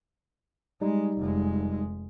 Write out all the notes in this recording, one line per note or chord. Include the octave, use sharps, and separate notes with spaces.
G3 G#3 D#4
F1 G#3